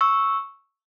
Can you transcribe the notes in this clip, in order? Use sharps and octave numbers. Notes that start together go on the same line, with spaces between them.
C#6 E6